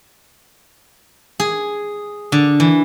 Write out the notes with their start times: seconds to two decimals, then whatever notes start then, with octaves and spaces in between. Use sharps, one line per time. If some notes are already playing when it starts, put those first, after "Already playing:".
1.40 G#4
2.32 D3
2.60 E3